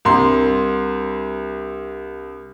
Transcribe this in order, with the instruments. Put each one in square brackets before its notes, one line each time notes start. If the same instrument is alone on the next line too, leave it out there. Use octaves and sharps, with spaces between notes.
[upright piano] C2 C6 [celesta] D4 G4 A#4